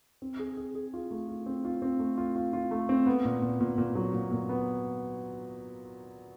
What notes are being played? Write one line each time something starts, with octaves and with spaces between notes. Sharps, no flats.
C4
G#4
G#4
G#4
F4
A3
F4
C4
F4
C4
A3
F4
F4
F4
A3
C4
B3
A#2
A#2
A#2
A#2
F#3
A#2
A#2
B3